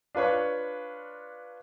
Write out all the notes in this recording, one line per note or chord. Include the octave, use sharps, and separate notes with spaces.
D4 F4 B4 C#5 C#6